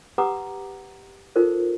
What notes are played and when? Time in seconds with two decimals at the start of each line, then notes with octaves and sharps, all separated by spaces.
0.18 G4 B4 F#5 A#5 D6 D#6
1.36 D#4 F4 A4 A#4 C5